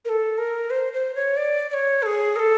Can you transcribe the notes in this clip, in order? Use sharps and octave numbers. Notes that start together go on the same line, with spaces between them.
A#4
A4
A#4
C5
C5
C#5
D5
D5
C#5
A4
G#4
A#4
A4